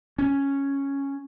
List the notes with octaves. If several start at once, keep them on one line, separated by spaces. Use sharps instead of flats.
C#4